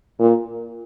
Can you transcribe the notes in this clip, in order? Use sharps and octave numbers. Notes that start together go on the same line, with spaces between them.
A#2